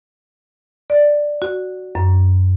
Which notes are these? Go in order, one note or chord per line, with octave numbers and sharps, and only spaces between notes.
D5
F#4
F#2